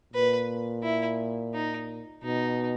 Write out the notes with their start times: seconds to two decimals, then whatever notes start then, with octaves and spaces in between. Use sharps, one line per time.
0.14 A#2 B4
0.83 E4
1.54 D#4
2.23 B2 D#4